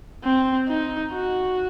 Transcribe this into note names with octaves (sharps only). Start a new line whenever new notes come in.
C4
D#4
F#4